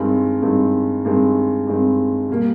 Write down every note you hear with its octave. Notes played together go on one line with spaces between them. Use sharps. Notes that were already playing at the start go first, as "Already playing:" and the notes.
Already playing: G2 D#3 G#3 C4
G2 D#3 G#3 C4
G2 D#3 G#3 C4
G2 D#3 G#3 C4
B2 G3 A#3